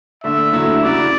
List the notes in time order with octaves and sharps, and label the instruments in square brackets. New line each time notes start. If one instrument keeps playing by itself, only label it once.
[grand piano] D3 A3 D4 [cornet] E5
[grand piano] D3 F#3 A3 E4
[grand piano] C#3 F#3 C#4 E4 [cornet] D5